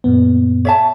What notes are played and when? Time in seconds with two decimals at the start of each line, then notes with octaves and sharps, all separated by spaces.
0.04 F#2 A#2 B3
0.65 C#5 E5 A5